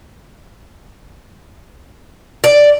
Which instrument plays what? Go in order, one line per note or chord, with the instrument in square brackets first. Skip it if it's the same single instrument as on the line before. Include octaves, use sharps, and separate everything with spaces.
[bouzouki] D5